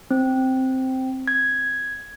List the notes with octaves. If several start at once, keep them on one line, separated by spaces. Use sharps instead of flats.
C4
G#6